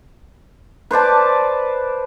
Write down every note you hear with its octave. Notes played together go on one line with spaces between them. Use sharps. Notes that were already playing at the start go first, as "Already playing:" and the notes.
B4 C5 D5 A5